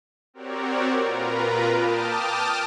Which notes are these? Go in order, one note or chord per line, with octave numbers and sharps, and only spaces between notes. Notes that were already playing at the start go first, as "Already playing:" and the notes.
C4 F#4 G4 A#4 C#5 D5
A#2 F4 A#4 B4 A#5
G5 A5 D6 D#6 F6